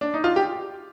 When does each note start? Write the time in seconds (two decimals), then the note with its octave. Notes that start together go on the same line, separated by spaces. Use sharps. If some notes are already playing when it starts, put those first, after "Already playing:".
0.01 D4
0.14 D#4
0.24 F4
0.36 G4